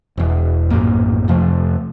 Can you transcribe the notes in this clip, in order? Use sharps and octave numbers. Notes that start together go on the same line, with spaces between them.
E1 E2
A#1 F#2 A2 A#3
F2 C3 F3 A3